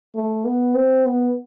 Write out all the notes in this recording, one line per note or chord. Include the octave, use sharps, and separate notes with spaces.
A3
B3
C4
B3